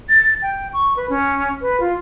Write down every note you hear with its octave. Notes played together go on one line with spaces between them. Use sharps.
A6
G5
C#6
B4
C#4
B4
F4